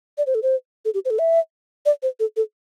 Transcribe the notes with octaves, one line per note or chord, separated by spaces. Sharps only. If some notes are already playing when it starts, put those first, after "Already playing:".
D5
C5
A4
C5
A4
G4
C5
A4
E5
D5
C5
A4
A4